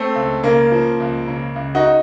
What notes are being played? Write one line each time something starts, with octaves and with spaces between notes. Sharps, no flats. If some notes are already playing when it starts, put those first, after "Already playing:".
Already playing: A3 C4
C#2
C#3 A#3
F3
C#2
C#3
C#2
D#4 F#4